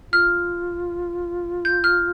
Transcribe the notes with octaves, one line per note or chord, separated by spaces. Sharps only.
F4 F6
G6
F6